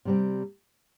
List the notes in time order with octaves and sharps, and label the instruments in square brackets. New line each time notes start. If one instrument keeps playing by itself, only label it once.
[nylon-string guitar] C3 G3 C4